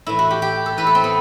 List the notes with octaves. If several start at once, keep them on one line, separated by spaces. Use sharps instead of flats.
A2 E3 E4
F#4
G4
G4
A4
A2 E3 B4
A4
C4
B3